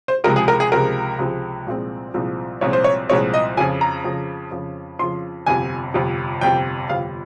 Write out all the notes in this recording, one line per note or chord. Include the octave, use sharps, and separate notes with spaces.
C5
C#2 C3 F3 G#3 A#4
G#4
A#4
G#4
C#2 C3 F3 G#3 A#4
C#2 C3 F3 G#3
C2 A#2 F3 G#3 C4
C2 A#2 F3 G#3 C4
C2 A#2 F3 G#3 C4 C#5
C5
C#5
C2 A#2 F3 G#3 C4 C#5
D#5
F2 C#3 F3 G#5
A#5
F2 C#3 F3
F2 C#3 F3
F2 C#3 F3 C6
G1 F2 C3 G#5
G1 F2 C3
G1 F2 C3 G5
G1 F2 C3 F5